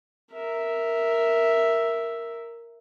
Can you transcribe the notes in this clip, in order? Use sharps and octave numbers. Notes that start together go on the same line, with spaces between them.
A#4 E5